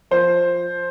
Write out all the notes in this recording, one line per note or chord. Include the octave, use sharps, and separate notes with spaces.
F3 C5